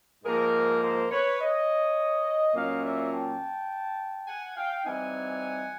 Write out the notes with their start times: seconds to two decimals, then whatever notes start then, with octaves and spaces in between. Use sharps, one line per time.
0.24 G#2 F3 A#3 G#4 A#4
0.82 A#4 C5
1.11 B4 C#5
1.39 C#5 D#5
2.54 A#2 F#3 A#3 C#4 F4 D#5 F5
2.83 D5 E5
3.12 G5 A5
4.27 F#5 G#5
4.56 F5 G5
4.85 E3 G3 C4 D#4 F#5 G#5